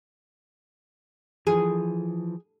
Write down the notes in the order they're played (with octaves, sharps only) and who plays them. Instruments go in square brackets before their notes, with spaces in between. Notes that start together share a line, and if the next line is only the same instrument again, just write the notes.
[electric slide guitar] E3 F3 [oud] G#4